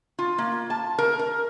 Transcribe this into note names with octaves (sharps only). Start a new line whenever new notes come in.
F4
A#3
A5
A#4
A#4